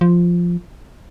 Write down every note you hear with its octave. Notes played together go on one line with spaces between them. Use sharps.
F3